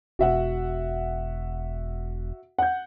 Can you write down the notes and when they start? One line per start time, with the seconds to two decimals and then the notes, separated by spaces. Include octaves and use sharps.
0.19 E1 F#4 E5 F#5
2.58 F#5 G6